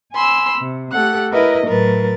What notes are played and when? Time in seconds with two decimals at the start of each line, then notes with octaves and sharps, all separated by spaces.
0.13 G#5 B5 C6 E6
0.59 C3
0.91 A3 G4 A4 F#5 F#6
1.32 E4 A#4 B4 D#5
1.66 A2 F#3 A#4 B4 A6